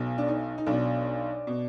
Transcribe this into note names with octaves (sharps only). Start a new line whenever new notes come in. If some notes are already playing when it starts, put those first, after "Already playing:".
Already playing: B1 B2
D4
D#4
D#4
B1 B2 D4
B2